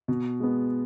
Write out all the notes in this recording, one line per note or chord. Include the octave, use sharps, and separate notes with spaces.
B2
G#3 B3